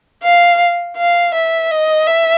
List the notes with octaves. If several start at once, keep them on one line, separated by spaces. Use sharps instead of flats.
F5
F5
E5
D#5
E5